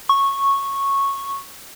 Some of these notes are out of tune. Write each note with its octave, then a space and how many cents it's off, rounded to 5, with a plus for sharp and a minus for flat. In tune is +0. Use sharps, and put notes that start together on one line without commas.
C#6 -10